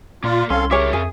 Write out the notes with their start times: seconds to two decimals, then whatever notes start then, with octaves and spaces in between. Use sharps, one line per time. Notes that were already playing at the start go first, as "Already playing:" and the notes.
0.24 A#2 A#3 F4 D5
0.50 C2 C4 C#4 A4 F5 C6
0.71 C#3 G4 G#4 A#4 C#5 E5
0.93 F2 G#4